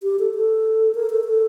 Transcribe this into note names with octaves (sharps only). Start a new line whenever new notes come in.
G4
A4
A4
A#4
A4
A4